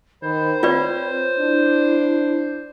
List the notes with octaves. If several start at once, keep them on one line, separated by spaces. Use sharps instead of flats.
D#3 C5 B5
C4 F4 B4 C#5 D5
D4 E4